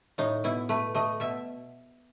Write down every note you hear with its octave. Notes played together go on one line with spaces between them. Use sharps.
A2 D#4
B2 E4
A3 B4
A3 D#5
B2 E5